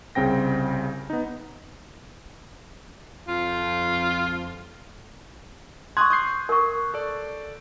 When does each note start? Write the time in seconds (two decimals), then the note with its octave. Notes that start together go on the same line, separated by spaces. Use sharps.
0.15 C2 C#3 C4 G5 A#6
1.10 B3 D#4
3.28 F2 F4
5.97 C6 C#6 D#6 F#6 G#6
6.10 D#6 G6 C7
6.49 A#4 C#6
6.94 A4 D5